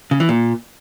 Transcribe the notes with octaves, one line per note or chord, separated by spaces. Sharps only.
C#3
E3
A#2